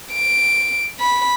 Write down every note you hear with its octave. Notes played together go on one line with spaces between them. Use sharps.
D7
B5